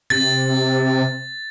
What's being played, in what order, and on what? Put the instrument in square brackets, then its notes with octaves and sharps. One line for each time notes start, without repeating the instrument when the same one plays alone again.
[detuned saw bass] C3 [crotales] A6